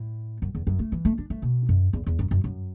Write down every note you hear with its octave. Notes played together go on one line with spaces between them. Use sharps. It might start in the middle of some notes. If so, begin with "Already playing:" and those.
Already playing: A2
F#2
E2
F#2
A3
E3
A3
D4
A3
B2
F#2
E2
E2
F#2
F#2
F#2